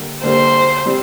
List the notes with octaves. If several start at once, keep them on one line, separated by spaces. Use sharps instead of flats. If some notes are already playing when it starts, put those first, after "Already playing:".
Already playing: D3 G3 A#3
D3 G3 A#3 C5
G3 C4